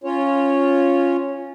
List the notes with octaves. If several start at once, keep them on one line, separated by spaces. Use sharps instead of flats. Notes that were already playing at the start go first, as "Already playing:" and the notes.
C#4 F4 C#5